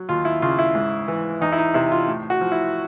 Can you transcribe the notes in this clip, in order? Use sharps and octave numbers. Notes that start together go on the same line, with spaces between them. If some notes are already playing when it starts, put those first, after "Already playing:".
Already playing: F#3
D#2 F4
E4
C#3 F4
E4
G#2
E3
E2 D#4
E4
D#4
C3 E4
F4
A2
F#4
F3
E4